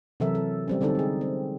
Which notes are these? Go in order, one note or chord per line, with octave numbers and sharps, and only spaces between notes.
C3 E3 F#3 A4 A#4 E5
A4
G3 C4 C#4
D3 G3 C4 D#4 A4
G#3 G#4
C4